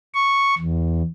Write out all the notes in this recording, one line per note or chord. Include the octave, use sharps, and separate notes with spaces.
C#6
E2